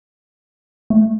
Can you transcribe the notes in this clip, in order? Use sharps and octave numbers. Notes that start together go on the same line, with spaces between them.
A3